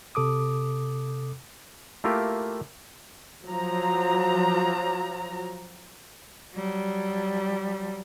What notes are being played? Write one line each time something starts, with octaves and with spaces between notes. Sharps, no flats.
C3 A4 D6 D#6
A3 A#3 E4 F4 G4 A#4
F3 F#3 A#5
F#3 G3